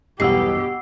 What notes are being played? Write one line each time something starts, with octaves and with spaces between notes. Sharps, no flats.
B1 E2 G2 B2 G4 F#5 E6 C7